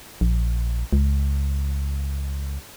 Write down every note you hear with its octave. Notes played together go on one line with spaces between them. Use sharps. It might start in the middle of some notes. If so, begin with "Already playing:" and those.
A#1
C#2